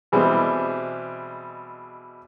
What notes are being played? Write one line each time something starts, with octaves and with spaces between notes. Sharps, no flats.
B2 E3 G3 G#3 C4